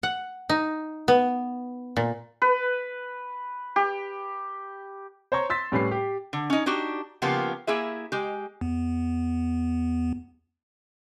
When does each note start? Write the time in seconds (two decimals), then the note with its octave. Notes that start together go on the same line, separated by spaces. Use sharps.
0.03 F#5
0.49 D#4
1.08 B3
1.97 A#2
2.42 B4
3.76 G4
5.32 C5 C#5 A#5 C#6
5.50 C6 E6 A6 B6
5.72 A2 G3 C#4 B4 B5 C7
5.91 G4
6.33 D3
6.50 C#4 D#4
6.66 D4 D#4 F#4 G4
7.22 C#3 F3 A#3 B3 F4 G4
7.67 A#3 E4 G#4 E5
8.12 G#3 G4
8.61 E2 B3